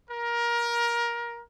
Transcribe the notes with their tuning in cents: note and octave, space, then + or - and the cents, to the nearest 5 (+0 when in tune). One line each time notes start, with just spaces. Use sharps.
A#4 +20